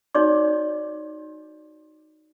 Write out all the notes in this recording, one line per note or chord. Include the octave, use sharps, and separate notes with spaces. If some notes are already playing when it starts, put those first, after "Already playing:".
D#4 F#4 C#5 D5 D6